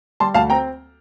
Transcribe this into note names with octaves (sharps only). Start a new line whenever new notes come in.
G3 A5 C6
D2 F5 A5
C4 G5 A#5